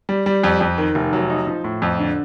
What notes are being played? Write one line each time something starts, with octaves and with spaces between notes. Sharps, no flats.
G3
G3
F2
F2
D#3
F1
F#3
D#4
F3
A2
F2
D3